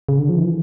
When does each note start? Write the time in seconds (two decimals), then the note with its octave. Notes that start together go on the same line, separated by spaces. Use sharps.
0.09 C#3
0.19 D3
0.29 F3
0.39 E3